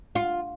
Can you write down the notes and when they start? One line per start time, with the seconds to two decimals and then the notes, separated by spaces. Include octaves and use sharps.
0.15 F4